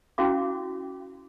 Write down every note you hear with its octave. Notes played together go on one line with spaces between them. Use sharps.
C#4 E4 F#4 F5 D6